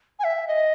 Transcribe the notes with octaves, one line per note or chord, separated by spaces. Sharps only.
G#5
E5
D#5